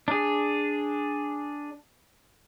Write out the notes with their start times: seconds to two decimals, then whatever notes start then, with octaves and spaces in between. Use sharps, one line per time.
0.08 D4 G#4